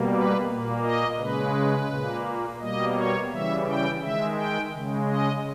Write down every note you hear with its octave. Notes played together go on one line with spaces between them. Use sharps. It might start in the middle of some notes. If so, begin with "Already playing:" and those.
Already playing: B2 G3 A#3
B4
A#2 A#3
D#5
C#3 G#3 B4
A#2 A#3
B2 G3 A#3 D#5
C#5
C#3 E3 G3 E5
G5
D#3 G#3 E5
G5
C#3 G#3
D#5